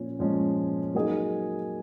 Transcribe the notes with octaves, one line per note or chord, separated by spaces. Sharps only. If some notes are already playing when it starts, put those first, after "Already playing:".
Already playing: A#2 F3 C#4
A#2 F3 G#3 C#4
F#3 A#3 D#4 G#4